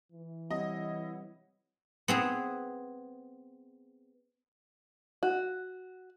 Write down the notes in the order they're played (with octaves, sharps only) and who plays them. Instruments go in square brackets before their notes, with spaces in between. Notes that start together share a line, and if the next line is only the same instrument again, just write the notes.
[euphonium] E3
[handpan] G3 C4 G4 [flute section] E4 C#5 F#5 [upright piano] D#5
[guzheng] B3 C4 G#4
[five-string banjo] F#4